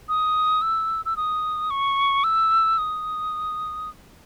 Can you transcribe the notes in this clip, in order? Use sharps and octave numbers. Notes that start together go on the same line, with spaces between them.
D#6
E6
E6
D#6
C#6
E6
D#6